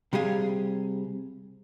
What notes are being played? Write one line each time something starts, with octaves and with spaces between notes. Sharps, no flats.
C3 G3 G4 G#4 F5